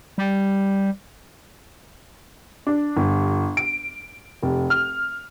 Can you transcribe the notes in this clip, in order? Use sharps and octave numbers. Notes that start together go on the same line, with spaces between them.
G3
D4
G1
D7
F1
F6